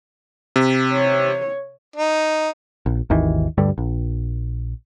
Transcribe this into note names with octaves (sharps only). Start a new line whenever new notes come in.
C3
C#5
D#4
A#1
G#1 D#2 D#3 E3
D2 G2 D3 G3
A#1